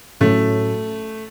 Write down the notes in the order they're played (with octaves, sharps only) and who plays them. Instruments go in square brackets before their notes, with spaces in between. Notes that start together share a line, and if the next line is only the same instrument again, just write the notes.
[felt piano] A2 F#3 C#4 [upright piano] A3